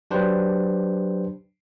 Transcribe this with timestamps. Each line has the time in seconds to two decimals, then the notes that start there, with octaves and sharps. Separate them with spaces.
0.11 F#3 D4 G4 B4 C5